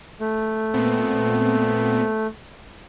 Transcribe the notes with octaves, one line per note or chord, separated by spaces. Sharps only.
A3
A#2 B3 C4